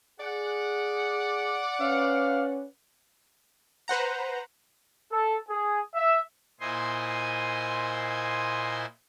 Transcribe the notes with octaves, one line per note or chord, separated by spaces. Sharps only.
G#4 D5 F#5
C#4 B4 F5
B4 C5 F#5 A#5
A4
G#4
E5
A#2 E4 C5 D#5 G#5 C6